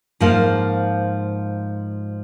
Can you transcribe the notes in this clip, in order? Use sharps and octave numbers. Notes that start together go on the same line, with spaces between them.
G#2 F3 A#3 F4